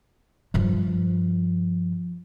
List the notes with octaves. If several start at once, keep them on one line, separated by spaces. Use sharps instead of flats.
G2 F3